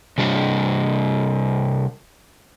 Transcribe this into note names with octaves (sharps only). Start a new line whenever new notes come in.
C3 G3 D4